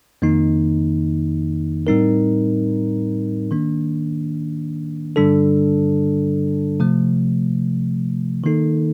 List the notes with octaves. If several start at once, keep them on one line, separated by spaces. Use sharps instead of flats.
F2 D#3 A#3 D#4
A2 G3 C4 D#4 A#4
D#3 A#3 D4
G2 D3 G3 D4 A4
C3 F3 A3
D#3 A#3 D#4 A4